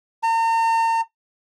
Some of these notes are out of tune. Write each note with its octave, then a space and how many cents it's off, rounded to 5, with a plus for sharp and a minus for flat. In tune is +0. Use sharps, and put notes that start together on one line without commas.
A#5 -40